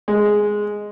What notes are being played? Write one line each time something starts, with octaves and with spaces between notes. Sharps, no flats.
G#3